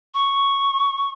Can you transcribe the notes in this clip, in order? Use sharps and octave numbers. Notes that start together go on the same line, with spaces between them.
C#6